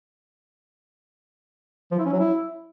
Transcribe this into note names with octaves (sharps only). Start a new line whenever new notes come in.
F3
E4
C#4
F#3
E4